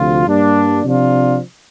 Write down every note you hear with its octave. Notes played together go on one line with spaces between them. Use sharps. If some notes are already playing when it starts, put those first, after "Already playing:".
Already playing: D2 C3 F3 F4
G2 G3 A#3 D4
C3 F3 D4 F4